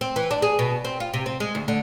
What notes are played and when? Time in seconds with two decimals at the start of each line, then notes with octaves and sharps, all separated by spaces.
0.01 C4
0.16 E3
0.31 D4
0.42 G#4
0.59 B2
0.85 C4
1.00 F4
1.14 C3
1.26 C4
1.40 G#3
1.55 D2
1.68 D3